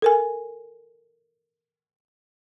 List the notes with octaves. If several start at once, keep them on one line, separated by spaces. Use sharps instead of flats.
A4 A#4 G#5